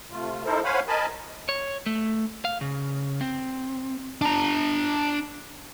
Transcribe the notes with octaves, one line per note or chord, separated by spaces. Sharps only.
C3 A3 F4
D#4 E4 A4 A#4 C5
C5 C#5 F5 F#5 G#5 B5
A#4 D#5 G#5 A5 B5
C#5
A3
F5
C#3
C4
D4 A#5